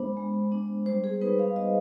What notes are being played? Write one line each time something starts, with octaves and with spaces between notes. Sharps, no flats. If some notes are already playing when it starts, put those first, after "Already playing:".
Already playing: G#3 B3 D4 C5
G#3
B3 D4
G3 C5
G#4
B3 D#4 B4
F5
G3 D#5